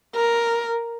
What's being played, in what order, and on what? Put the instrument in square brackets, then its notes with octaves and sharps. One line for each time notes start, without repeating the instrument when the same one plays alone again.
[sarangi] A#4